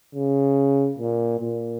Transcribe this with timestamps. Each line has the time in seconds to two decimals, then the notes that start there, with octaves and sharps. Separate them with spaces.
0.15 C#3
0.98 A#2
1.40 A#2